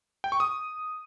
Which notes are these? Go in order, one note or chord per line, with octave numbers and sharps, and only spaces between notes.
G5
C#6
D#6